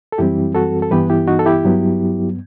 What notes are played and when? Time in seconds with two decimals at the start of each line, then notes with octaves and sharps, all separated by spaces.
0.12 A4
0.18 F#2 E3 G3 C4 E4 G4
0.54 F#4 A4
0.82 A4
0.91 G2 E3 B3 G4 B4
1.10 E4 G4
1.28 D#4 F#4
1.39 A4
1.46 E4 G4
1.65 G2 F#3 B3